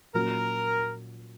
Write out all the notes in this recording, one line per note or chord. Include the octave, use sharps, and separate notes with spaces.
A#2 F#3 A#3 C#4 F#4 A#4